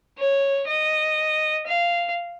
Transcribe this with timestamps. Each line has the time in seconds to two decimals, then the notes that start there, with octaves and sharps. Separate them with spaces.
0.19 C#5
0.68 D#5
1.67 F5